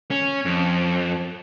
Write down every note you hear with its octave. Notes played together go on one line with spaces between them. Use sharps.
C#4
F2